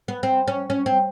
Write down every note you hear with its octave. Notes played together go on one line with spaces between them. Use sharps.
B3
C4
C#4
C#4
C4